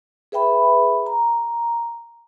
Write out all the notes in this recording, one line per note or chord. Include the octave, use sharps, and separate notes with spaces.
G#4 B4 E5 G5 B5
A#5